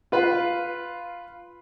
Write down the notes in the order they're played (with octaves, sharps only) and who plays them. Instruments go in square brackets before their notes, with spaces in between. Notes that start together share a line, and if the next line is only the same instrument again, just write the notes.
[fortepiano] F4 B4 F5